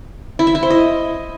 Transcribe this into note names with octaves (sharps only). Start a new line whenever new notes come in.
E4
E5
E4
C5
D#5